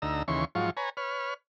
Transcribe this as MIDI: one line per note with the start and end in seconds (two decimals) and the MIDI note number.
0.02 0.23 38
0.02 0.23 63
0.02 0.23 82
0.02 0.23 88
0.28 0.45 39
0.28 0.45 49
0.28 0.45 52
0.28 0.45 84
0.28 0.45 85
0.55 0.70 44
0.55 0.70 53
0.55 0.70 54
0.55 0.70 65
0.55 0.70 85
0.77 0.90 71
0.77 0.90 73
0.77 0.90 80
0.77 0.90 82
0.97 1.34 71
0.97 1.34 73
0.97 1.34 89